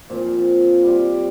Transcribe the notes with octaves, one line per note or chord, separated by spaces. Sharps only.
A#2 F3 C4
G3 C4 F4 D5